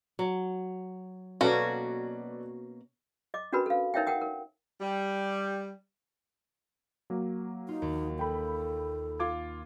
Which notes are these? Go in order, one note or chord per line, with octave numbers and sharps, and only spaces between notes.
F#3
B2 A#3 C#4 F#4 A4 B4 D5
D#5 D6
C#4 D4 F#4 A#4 B4 B5
A4 F5
D#4 A#4 C#5 E5 F5 G5
A#4 F#5 G5 D#6
A#4
G3
F#3 A#3
D#4 F4
D#2
A4 G5 B5
F4 D6 G#6